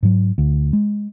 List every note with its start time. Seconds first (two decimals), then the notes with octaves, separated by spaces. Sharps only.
0.03 G#2 F#3
0.38 D2
0.73 G#3